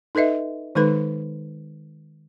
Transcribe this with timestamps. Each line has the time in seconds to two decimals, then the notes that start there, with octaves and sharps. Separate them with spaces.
0.15 D#4 A4 B4 D#5 E5
0.75 D#3 G#3 D#4 A4 B4 B5